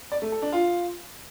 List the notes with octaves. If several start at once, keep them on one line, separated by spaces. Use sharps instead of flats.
D5
A3
A4
D4
F4